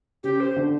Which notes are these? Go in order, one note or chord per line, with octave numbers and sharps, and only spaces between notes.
C#3 G4
C5
D3